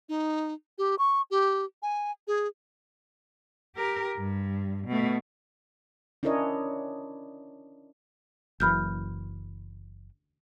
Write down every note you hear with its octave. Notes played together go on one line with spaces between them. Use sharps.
D#4
G4
C#6
G4
G#5
G#4
G4 A#4
G2
B2 A3
C#4 D4 E4 A#4 C#5 D#5
F#1 F#2 E3 B5 F6 G6